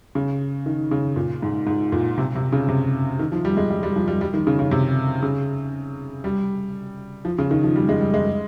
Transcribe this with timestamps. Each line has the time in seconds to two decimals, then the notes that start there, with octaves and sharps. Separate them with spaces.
0.15 C#3
0.66 D#3
0.91 C#3
1.16 A#2
1.42 G#2
1.67 G#2
1.92 A#2
2.18 C3
2.35 C3
2.52 C#3
2.69 C3
3.19 D#3
3.32 F3
3.45 G3
3.57 G#3
3.70 G3
3.83 G3
3.96 F3
4.08 G3
4.21 G3
4.34 D#3
4.47 C#3
4.59 C#3
4.71 C3
5.22 C#3
6.24 G3
7.25 F3
7.38 C#3
7.51 D#3
7.64 F3
7.76 G3
7.89 G#3
8.01 G3
8.14 G#3